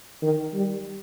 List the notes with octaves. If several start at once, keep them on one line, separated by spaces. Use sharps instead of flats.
D#3
G3